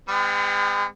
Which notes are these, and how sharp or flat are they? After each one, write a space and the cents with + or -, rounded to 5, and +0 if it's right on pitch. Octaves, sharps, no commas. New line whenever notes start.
G#3 -40 C4 -45 G5 +0